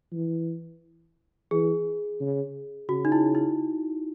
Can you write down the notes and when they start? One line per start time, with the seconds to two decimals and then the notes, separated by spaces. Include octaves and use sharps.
0.13 E3
1.51 E3 G#4
2.20 C#3
2.89 C#3 F#4
3.05 D#4
3.12 E4
3.35 E4